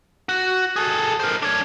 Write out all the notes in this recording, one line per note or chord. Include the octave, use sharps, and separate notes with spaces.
F#4
G#4 A4
A#4 C5
D4 C#5